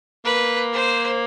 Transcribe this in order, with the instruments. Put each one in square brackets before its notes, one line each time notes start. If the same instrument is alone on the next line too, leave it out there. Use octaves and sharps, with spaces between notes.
[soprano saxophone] A#3 [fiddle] B4
[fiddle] C5